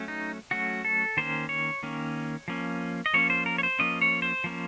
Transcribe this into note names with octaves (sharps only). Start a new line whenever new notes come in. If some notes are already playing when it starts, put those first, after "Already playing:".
Already playing: F#3 A3 C#4
D#4
F#3 A3 C#4 F#4
A4
D#3 A#3 C#4 C5
C#5
D#3 A#3 C#4
F3 A#3 C#4
D#5
F3 A#3 C#4 C#5
C5
A#4
C#5
C5
F3 A#3 C#4 D#5
C#5
C5
F3 A#3 C#4